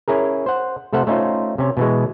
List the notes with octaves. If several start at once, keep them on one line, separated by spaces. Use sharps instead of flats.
C#4 E4 G#4 A#4
C5 F#5
C3 A3 A4 C5 F#5
A3 C#4 D#4 F4 C5
C3 C#4
B2 E3 G#3